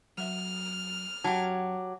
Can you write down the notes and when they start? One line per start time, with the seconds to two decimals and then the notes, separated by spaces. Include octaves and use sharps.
0.18 F#3 E5 F6
1.24 F#2 F#3 G4 A5